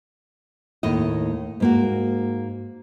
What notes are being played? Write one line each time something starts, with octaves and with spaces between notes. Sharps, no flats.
D#2 A2 D#5
G#2 A#3 F#4